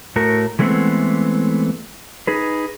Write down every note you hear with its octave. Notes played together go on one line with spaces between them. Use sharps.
A2 A3 F#4 A#4
E3 G#3 A3 B3 C4
D#4 G#4 B4